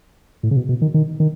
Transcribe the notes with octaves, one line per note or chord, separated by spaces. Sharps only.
A2
C#3
B2
B2
D#3
D#3
D#3